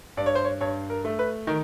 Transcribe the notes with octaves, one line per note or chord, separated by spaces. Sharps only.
G2 D5
C#5
C5
C#5
G2 C#5
A#4
A3
B4
D#3 A#4